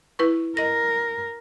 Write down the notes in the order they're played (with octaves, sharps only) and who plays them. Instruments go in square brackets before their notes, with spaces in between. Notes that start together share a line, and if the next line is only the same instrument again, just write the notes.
[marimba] E4 B4 C#6
[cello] A#4 [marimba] D#5 A#6